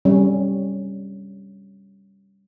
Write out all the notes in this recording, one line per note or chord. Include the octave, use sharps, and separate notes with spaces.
G3 C#4